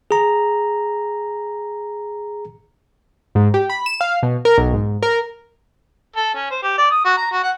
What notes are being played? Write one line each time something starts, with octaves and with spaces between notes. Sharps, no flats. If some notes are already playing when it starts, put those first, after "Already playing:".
G#4 A#5
G#2
G4
B5
E7
F5
B2
A#4
B1
G#2
A#4
A4
C#4
C5
G4
D5
D#6
F#4
A#5
F#4
F#5